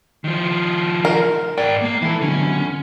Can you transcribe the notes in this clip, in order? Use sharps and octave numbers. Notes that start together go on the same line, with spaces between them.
D#3 F3
A#4
G#2 D5 G5
A#3 A#5
E3 E4 A4
D3 F#3 B3 C#4